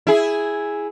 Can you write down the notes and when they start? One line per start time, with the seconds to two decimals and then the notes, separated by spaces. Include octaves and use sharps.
0.07 E4 G#4